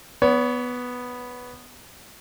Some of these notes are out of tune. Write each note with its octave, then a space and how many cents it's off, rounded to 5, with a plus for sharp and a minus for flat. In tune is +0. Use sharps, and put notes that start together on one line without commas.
B3 +0 C#5 +40